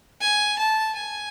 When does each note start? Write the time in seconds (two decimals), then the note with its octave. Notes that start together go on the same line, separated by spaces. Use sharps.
0.21 G#5
0.59 A5
0.95 G#5